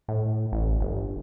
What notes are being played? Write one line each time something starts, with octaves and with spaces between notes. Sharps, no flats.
A2
A1
G1